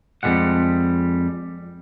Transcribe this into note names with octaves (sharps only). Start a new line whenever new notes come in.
F2 D#3 G3 G#3 F#5